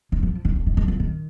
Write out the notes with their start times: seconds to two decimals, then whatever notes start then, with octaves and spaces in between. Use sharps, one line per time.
0.12 D#3
0.23 F3
0.45 D#3
0.56 D3
0.66 D#3
0.77 D#3
0.88 F3
1.00 D#3